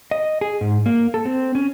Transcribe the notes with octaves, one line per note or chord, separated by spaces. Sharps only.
D#5
G#4
G#2
A#3
A4
C4
C#4